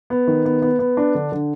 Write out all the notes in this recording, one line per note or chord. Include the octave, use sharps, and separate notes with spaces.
B3
D#3
B3
B3
B3
D4
D3
D3